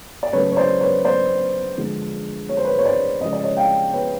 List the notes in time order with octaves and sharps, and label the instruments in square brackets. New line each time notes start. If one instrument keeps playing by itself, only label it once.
[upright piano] D5
C#3 F#3 A3 B4 C#5
C#5
C5 D5
B4 C#5
C5 D5
D3 F3 G#3
C#5
C5
B4 C#5
C#5
C5 D5
C#3 F3 G#3 D#5
D5
C#5 D#5
F5 G5
B4 C#5